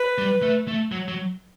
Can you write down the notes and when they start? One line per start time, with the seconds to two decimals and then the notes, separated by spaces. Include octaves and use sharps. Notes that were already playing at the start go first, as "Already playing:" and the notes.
Already playing: B4
0.18 G3
0.43 A3
0.68 A3
0.92 F#3
1.08 F#3